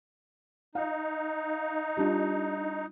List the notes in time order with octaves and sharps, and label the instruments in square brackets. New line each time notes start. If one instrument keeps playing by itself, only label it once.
[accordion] D#4 [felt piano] F5
[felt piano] G3 D4 F4